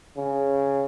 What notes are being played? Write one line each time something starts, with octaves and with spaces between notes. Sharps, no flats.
C#3